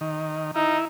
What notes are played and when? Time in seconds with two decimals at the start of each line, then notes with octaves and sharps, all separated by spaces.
0.01 D#3
0.56 D#4 E4